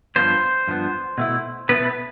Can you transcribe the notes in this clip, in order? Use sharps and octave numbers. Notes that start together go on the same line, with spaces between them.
G2 F3 B3 C5
G2 F3 B3
B2 A3 E4
B2 A3 B3 E4 B4